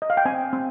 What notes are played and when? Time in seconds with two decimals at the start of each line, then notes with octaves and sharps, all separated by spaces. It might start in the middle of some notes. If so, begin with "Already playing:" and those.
0.02 D#5
0.10 F5
0.17 G5
0.25 C4 G#5
0.53 C4